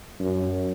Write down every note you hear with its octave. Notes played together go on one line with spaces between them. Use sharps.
F#2